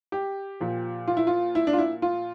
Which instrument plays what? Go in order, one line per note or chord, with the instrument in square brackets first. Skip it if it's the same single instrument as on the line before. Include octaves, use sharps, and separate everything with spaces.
[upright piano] G4
A#2 F3
F4
E4
F4
E4
D4
F4
E4
F4